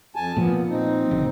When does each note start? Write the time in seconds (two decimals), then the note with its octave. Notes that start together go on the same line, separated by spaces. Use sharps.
0.16 F2 G#5 A5
0.37 A#2 F3 B3
0.69 C4 D#4
1.11 F#1